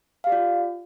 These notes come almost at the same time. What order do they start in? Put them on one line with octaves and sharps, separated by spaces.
F5 G4 D5 F4